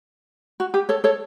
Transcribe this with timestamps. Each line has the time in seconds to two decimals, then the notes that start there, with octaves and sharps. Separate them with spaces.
0.60 F#4
0.74 G4
0.89 A4 C#5
1.04 A4 C#5